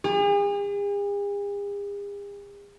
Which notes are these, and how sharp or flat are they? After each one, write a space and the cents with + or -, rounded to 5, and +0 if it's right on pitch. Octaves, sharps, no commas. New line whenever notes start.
G#4 -45